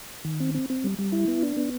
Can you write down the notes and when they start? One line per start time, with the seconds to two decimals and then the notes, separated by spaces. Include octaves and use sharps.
0.25 D#3
0.40 C4
0.55 C4
0.70 C4
0.84 G3
0.99 G3
1.12 E4
1.28 B3
1.43 D4
1.57 B3